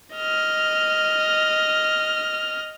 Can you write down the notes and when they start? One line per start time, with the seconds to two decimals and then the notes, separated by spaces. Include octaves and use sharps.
0.16 D#5 F6